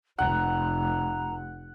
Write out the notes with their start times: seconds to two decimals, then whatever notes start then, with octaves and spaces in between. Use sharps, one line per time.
0.18 F1 F#5 A#5